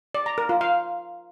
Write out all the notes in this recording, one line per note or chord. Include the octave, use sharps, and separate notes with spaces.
D5
A#5
A#4
F4
F5